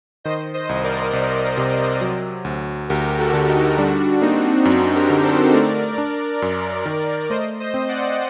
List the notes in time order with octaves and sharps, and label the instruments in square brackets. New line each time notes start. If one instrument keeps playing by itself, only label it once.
[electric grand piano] D#3 [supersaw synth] C5 D#5
[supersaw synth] C5 D#5
[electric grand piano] C2
[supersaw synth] A#4 D5
[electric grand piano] C2
C3
F#3
D2
[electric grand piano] D2 [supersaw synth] G4 A#4
[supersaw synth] F#4 A4
[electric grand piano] D3
[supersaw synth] D#4 G4
[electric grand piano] G3 [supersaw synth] D4 F#4
[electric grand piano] A#3 [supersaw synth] C4 D#4
[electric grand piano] F#2 [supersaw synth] C4 D#4
[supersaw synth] G4 A#4
[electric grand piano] D3
[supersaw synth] A4 C5
[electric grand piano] A3 [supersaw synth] A#4 D5
[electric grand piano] D4
F#2
D#3
[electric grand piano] A3 [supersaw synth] C5 D#5
[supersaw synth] C5 D#5
[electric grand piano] C4
[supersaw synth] D5 F#5